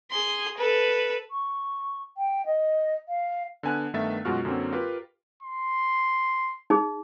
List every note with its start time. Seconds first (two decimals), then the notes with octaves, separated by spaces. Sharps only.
0.11 G#4 C6
0.57 A4 B4
1.31 C#6
2.17 G5
2.46 D#5
3.09 F5
3.63 D3 B3 G#5 A5 F#6
3.94 G2 D#3 A3 B3 E5 A6
4.25 F#2 B2 G#3 F4 F#4 F6
4.45 F#2 D3 F#3 A#3 C4
4.72 F4 G4 A#4 B4
5.43 C6
6.70 D#4 G#4